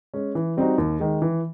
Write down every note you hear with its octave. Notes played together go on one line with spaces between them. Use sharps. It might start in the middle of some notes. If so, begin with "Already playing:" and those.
G#3 C#4
E3
G3 C4 D#4 F#4
D#2
D#3 G#3
E3